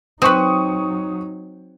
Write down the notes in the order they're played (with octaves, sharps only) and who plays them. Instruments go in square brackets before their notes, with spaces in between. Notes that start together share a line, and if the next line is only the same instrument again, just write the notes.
[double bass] F#3 D#4 [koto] C4 B4 [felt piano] C#6 D#6